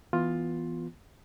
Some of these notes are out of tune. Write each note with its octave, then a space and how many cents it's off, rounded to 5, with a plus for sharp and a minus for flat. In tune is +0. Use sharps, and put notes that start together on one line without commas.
E3 +0 B3 -5 F4 +10